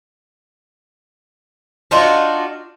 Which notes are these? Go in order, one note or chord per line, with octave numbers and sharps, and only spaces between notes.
D4 D#4 F4 F#4